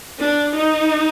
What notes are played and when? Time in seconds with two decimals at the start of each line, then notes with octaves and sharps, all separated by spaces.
0.19 D4
0.55 D#4